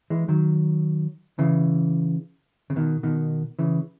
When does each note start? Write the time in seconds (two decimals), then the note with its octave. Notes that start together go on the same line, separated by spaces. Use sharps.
0.10 E3 G#3
0.28 D#3 F#3
1.39 C#3 E3
2.70 C#3
2.76 B2 D#3
3.03 B2 D#3
3.59 C#3 E3